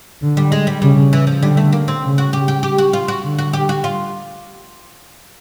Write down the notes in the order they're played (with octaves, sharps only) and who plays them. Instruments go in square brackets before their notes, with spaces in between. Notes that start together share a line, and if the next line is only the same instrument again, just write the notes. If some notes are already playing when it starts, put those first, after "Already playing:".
[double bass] D3
[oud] G3
G#3
G3
[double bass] C#3 [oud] G3
[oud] E3
F3
[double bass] D3 [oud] G3
[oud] A3
A#3
C4
[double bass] C#3
[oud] F#4
G4
G4
G4
F#4
F4
F#4
[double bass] D3
[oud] F#4
G4
F#4
F4